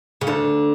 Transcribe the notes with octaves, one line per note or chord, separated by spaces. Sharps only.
C#3
D2 D3